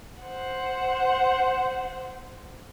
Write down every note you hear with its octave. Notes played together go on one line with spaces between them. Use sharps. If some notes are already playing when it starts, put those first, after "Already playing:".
C5 F#5